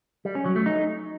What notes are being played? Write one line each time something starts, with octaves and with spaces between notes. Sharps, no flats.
G3
C#4
F#3
A3
D#4